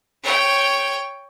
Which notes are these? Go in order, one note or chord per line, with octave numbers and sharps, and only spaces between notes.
C#5 G5